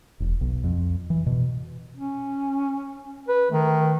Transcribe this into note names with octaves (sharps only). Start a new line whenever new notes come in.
E1
B1
F2
E3
B2
C#4
B4
D#3 A3